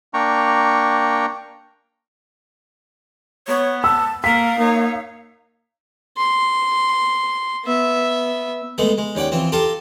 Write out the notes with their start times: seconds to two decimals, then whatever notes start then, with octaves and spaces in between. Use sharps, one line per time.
0.14 A#3 D4 G5 A#5 C#6
3.48 B3 C#5
3.84 A5 E6
4.24 A#3 A#4 F5 B6
4.59 A#3 D#4 C#5
6.17 C6
7.64 B3 E5
8.78 G#3 A3 B3 G#4
8.98 G#3
9.15 D#2 C#4 D5 F#5 G5
9.32 E3 F3 C4
9.52 F4 G4 A4 F5 A5 A#5